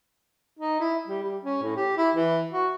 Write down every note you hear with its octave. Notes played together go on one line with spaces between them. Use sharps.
D#4
E4
G3
G3
C#4
A2
G4
E4
E3
F#4